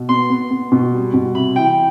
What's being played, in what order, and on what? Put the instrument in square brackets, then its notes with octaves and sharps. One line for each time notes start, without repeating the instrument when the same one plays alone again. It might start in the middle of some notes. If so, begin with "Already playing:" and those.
Already playing: [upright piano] B2
[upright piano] B3 [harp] C6
[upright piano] B3
B3
B2
G3
B2
[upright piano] C3 [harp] B5
[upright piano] E3 [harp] G5